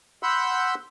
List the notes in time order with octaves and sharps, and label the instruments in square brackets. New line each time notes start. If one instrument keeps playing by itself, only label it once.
[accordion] F#5 B5 C6 E6 G6